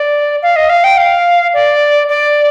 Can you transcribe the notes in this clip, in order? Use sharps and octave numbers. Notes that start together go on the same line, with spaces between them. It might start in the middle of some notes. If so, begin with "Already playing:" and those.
Already playing: D5
F5
D#5
F5
G5
F5
D5
D5